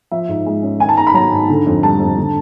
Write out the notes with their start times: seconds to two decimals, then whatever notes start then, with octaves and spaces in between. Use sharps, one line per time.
0.11 F3 E5
0.28 G#2
0.46 G#3
0.63 C#4
0.80 D#3 G#5
0.89 A5
0.97 G#2 A#5
1.07 B5
1.14 F#3 A#5
1.32 G#2
1.49 D3
1.67 F2
1.83 G3 A5
2.00 F2
2.18 D3